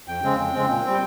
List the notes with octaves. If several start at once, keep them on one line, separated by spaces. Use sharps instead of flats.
F2 G5
C#3 G#3 C4
F2
C#3 G#3 C4
A#2
G3 C4